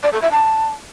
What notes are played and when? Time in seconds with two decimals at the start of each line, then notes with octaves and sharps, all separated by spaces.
0.03 D5
0.13 A4
0.22 E5
0.32 A5